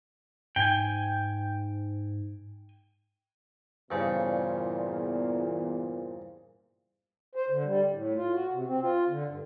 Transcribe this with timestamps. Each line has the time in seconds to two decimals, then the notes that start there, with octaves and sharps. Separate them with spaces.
0.56 G#2 G5 G#5
3.91 E2 G2 A#2 C#3 E4 C5
7.35 C5
7.50 D3
7.64 G3
7.92 A2
8.16 F4
8.33 F#4
8.52 C3
8.67 C4
8.82 F4
9.08 D3
9.28 G2